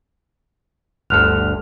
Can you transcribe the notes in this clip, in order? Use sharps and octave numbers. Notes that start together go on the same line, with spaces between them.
G1 D2 A4 F6 F#6 F7